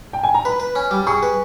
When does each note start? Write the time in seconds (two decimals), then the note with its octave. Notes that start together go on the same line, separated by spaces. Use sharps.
0.13 G5
0.23 G#5
0.34 A#5
0.45 B4 B5
0.60 B4
0.75 C#4
0.91 G3
1.07 G#4 C#6
1.23 B4